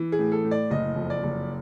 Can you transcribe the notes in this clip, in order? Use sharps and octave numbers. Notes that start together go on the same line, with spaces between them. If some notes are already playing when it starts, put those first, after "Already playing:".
Already playing: E3
G#4
A2
A4
A2
D5
F#1 D#5
F2
D5
F#1